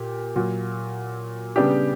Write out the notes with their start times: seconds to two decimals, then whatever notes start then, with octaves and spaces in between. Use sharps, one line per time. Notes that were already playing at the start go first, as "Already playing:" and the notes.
Already playing: A#2 G4
0.36 A#2 F#3 A#3
1.56 C#3 G3 B3 D4 G4